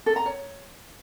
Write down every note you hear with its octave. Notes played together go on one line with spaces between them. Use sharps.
A4
A#5
C#5